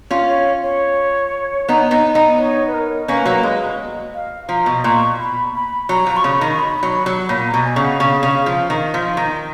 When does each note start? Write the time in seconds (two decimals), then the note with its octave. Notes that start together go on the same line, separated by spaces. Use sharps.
0.11 C#4 F4
0.28 C#5
0.63 C#5
1.69 B3 D#4
1.91 B3 D#4
2.15 B3 D#4
2.38 C#5
2.67 B4
2.74 A#4
3.08 A#3 C#4 B4
3.26 F#3 A#3
3.43 G#3
3.79 D#5
4.14 F5
4.49 F3 A#5
4.66 B2
4.84 A#2 C#6
5.20 B5
5.54 B5
5.89 F#3 A#5
6.07 F3
6.17 C#6
6.24 C#3 B5
6.41 D#3
6.53 C#6
6.59 B5
6.83 F#3
7.06 F#3
7.29 A#2 B5
7.47 A#5
7.54 B2
7.64 G#5
7.76 C#3
7.82 F#5
8.00 C#3 F5
8.23 C#3
8.46 F3
8.70 D#3
8.94 F3
9.17 D#3